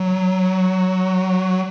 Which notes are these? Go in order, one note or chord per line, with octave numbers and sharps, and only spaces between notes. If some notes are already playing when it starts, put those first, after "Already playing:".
Already playing: F#3